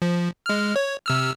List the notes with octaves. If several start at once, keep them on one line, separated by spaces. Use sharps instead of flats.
F3
G#3 F6
C#5
C3 E6 F6